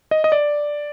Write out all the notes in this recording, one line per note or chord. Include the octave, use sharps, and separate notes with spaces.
D#5
D#5
D5